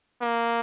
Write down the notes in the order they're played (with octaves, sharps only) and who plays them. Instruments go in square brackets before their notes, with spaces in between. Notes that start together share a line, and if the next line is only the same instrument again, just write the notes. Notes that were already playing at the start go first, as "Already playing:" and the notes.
[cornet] A#3